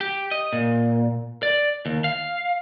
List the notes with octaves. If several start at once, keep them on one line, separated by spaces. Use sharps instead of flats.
G4
D#5
A#2
D5
D#2
F5